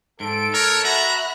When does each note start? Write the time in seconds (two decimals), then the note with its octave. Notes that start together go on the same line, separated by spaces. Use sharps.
0.20 G#2 A4 D7
0.54 A#4 C#5
0.85 F#4 E5 A#5 B5 F#6